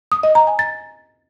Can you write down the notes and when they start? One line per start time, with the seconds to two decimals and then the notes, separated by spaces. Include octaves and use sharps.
0.12 D#6
0.23 D#5
0.35 A#5
0.47 G#5
0.59 A6